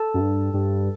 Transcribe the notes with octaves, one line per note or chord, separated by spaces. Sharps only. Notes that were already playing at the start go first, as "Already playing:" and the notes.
Already playing: A4
F#2
G2
G2